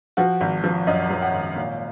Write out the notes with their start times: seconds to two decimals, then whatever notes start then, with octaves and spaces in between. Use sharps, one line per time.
0.17 F3 F#4
0.41 G#1
0.64 F3
0.87 F#2 D#5
1.10 F3
1.22 F#5
1.33 G#1
1.56 A#2 F5